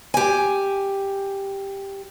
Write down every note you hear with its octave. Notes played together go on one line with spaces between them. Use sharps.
G4 G#5